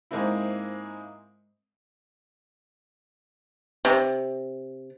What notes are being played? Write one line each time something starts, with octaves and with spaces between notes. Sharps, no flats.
G#2 G#3 A#3 C4 E4
C3